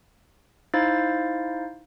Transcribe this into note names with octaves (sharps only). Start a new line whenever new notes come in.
D#4 E4 C5 F5 A6